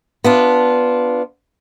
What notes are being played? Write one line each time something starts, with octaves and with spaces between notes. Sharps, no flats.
B3 D4 F4